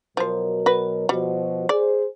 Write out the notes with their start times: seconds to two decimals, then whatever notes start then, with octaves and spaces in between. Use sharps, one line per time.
0.17 B2 F3 F#3 A#4 C5
0.66 F#4 B4
1.09 B2 F3 G3 F#4
1.69 G#4 C5 D5